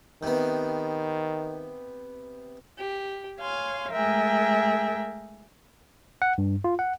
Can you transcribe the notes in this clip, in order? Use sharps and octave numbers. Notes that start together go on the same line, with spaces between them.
C3 D#3 B3
G4
C#5 F5 G#5 C6
G#3 A3 G#4 A#4 E5 G5
F#5
G2
F4
F#5